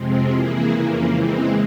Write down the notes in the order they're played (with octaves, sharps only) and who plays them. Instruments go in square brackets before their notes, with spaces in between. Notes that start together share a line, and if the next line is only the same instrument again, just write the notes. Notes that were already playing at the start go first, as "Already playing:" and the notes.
Already playing: [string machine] F2 C3 F3 G#3 C4
E3 A#3 E4 G#4
F2 C#3 E3 A#3
E3 G#3 C4